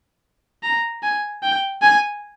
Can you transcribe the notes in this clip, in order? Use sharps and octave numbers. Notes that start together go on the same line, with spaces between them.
A#5
G#5
G5
G#5